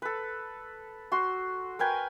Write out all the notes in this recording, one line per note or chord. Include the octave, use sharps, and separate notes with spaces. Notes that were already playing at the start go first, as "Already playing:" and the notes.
A4 B4
F#4 C6
A#4 B4 G5 G#5